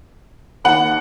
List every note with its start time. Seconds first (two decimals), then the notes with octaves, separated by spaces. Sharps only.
0.64 D#2 D#3 F#5